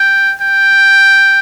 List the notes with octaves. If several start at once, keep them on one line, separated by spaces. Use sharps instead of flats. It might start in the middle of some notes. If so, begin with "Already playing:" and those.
Already playing: G5
G5